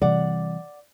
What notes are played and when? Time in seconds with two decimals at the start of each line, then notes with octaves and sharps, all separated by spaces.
0.02 C3 E3 G3 D5 F#5